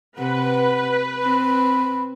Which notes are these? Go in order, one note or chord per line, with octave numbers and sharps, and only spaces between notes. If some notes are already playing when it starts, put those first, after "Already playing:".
C3 B4 F#5
C4 B5